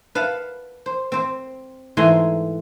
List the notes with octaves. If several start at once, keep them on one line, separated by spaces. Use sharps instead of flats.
B4 F5 F#5 A5
C5
C4 C5
G#2 E3 A3 G#5 A#5 C6